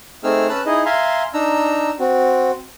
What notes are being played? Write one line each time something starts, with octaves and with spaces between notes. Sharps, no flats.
A3 C4 D#4 G#4 E6 F6
C#4 B4 A5 E6 F#6
D#4 E4 G#4 D#5
E5 F5 G#5 A#5 C6
D4 D#4 A#5 E6
C4 F#4